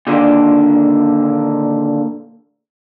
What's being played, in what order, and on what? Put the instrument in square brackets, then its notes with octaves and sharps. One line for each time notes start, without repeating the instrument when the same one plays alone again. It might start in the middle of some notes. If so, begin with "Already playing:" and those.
[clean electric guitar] A#2 D3 D#3 G3 A#3 D4